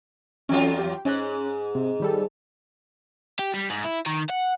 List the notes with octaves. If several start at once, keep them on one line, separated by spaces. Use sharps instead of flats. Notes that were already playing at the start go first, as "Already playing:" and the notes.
E2 F#3 C#4 F4 A4
G4
G#2 C#4 F#6
C3
D#3 G3 A4
G4
G3
G#2
E4
D#3
F#5